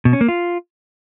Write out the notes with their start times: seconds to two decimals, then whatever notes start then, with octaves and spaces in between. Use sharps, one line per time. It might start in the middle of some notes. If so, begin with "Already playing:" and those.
0.05 B2
0.13 C#4
0.21 A#3
0.28 F4